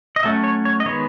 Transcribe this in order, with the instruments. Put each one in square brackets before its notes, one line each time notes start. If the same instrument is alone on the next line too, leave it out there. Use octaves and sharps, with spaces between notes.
[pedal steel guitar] D#5
F#3 A3 C#4 E5
C#5
C#5
D#5
D#3 G#3 B3 C#5